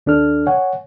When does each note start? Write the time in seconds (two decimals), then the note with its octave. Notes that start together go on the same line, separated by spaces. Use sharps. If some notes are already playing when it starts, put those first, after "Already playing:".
0.06 D#2 D4 A4 F6
0.47 C#5 F#5 G#5